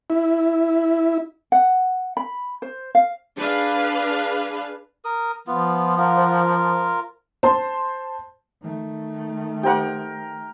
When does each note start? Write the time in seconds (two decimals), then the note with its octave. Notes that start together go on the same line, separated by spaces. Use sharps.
0.10 E4
1.52 F#5
2.17 B5
2.62 C5
2.95 F5
3.37 D4 G#4 B4 F5
5.05 A#4 D#6
5.47 F3 B3 F4
5.99 F4 A#4 F5 F#5
6.18 C5
7.43 C5 A5 C6
8.63 D#3 A3
9.63 G4 A#4 C5 F#5 G5